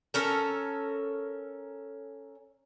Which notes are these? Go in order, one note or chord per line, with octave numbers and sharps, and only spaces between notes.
C#4 A4 A#4